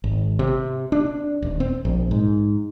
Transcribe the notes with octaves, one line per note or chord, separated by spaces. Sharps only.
G#1
C3
D4
D#1
C4
A#1
G#2